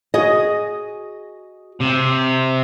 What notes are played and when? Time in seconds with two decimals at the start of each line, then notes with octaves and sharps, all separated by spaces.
0.14 F#4 G#4 D#5
1.80 C3